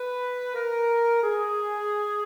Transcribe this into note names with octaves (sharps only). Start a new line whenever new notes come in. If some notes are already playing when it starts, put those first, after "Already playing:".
Already playing: B4
A#4
G#4